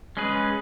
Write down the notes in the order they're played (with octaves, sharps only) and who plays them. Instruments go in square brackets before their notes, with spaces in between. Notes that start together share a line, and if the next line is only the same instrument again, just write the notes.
[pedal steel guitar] G#3 C#4 G#4 B4